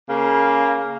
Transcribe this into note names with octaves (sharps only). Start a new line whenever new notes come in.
C#3 A#3